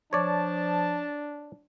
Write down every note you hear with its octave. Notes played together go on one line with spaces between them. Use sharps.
F3 D4 C#5 D5 A5